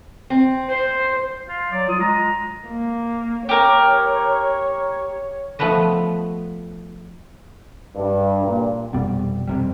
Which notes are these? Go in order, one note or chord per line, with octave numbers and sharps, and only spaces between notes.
C4
C5
F4
F#3 D5
F4 D#6
G#3 A#5
A#3
G4 A#4 C#5
F3 A3 B3 B4 D#5
G2
A#2
F1 B2 G3
F2 C3 G3